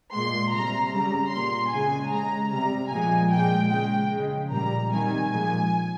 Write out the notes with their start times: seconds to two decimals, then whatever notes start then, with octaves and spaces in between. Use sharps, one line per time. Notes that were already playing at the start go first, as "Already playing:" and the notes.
0.13 A#2 G#3 C6
0.52 C3 G3 A#5
0.92 C#3 G3 A#5
1.32 A#2 G3 C6
1.72 C#3 G#3 G#5
2.11 C#3 G#3 A#5
2.51 C3 G3 A#5
2.91 A#2 F3 G#3 G#5
3.31 A#2 G#3 G5
3.70 C#3 G#3 G5
4.10 C#3 F3 G#3
4.50 A#2 G3 A#5
4.90 C3 D#3 G3 G#5
5.30 A#2 F3 G#3